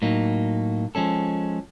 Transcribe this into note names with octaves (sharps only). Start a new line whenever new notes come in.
A2 F#3 A#3 D#4
F3 G#3 C#4 A4